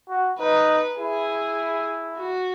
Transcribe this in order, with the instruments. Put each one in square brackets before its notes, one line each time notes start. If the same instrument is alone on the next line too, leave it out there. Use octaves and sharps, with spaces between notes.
[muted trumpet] F#4
[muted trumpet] D#4 [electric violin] B4
[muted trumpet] E4 [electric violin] G#4
[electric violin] F#4